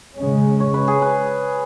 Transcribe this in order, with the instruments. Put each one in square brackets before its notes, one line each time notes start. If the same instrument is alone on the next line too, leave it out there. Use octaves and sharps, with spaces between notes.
[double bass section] C#3 G#3 C#4
[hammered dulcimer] C#5
B4
G#4
B4